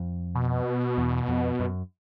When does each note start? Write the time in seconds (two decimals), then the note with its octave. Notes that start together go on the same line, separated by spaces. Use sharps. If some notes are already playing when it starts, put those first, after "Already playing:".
Already playing: F2
0.35 B2
0.98 E2
1.28 F2
1.60 F#2